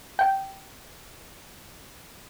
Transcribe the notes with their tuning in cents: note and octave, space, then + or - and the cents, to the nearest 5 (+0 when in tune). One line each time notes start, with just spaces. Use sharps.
G5 -15